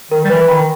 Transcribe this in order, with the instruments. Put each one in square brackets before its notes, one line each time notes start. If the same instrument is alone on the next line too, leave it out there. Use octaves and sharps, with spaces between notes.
[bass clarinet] D#3 [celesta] A#4
[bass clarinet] G3
[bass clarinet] E3 [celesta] B4
[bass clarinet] D#3 [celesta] B5